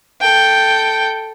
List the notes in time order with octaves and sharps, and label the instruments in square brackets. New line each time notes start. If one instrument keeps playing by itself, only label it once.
[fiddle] A4 G5